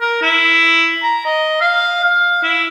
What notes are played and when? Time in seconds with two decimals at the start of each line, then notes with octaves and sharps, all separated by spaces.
0.01 A#4
0.22 E4
1.03 A#5
1.26 D#5
1.61 F5
2.04 F5
2.43 E4